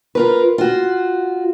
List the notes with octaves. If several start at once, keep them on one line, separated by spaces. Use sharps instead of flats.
F4 A#4 B4
F4 F#4